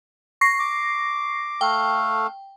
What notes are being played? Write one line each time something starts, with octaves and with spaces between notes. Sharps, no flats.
C#6 A#6 C7
D6
A3 A4 F5 G5